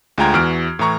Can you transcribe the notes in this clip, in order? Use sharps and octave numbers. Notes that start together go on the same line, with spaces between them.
D2 G#3 F4 G5 A#5 G#6
E2 E3 F#4 F6 D7
A2 E3 A#5 C#6